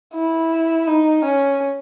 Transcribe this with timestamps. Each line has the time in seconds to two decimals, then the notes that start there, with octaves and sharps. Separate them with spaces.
0.14 E4
0.88 D#4
1.25 C#4